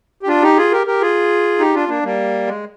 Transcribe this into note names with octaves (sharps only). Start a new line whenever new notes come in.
G4
D4 F4
D#4 G4
F4 G#4
G4 A#4
G4 A#4
F4 G#4
D#4 G4
D4 F4
A#3 D4
G3 A#3
G#3